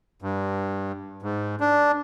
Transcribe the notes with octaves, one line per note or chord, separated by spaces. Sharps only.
G2
G#2
D4